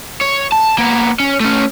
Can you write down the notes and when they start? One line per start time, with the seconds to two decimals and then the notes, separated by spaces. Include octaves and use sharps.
0.21 C#5
0.52 A5
0.78 A#3 B3
1.20 C#4
1.41 A3 C#4